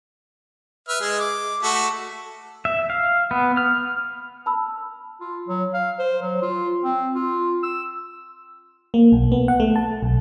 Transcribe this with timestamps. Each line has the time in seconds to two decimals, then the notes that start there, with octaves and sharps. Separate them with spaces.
0.88 B4 E5 F6
1.00 G#3 G#4
1.20 D6
1.63 A3 F#4 A4
2.65 E5
2.90 F5
3.31 B3
3.57 F6
4.46 A5 B5 E6
5.21 F4
5.48 F#3
5.74 F5
5.99 C5
6.22 F#3
6.42 F4
6.84 C4
7.15 F4
7.63 E6
8.94 A#3
9.12 B1
9.32 B3
9.48 F#5
9.60 A3
9.76 A5
10.03 B1